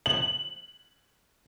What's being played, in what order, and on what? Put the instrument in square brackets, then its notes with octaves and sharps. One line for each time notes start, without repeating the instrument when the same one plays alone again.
[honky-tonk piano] F#7